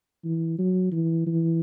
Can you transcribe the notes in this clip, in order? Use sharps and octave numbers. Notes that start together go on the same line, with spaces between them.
E3
F#3
E3
E3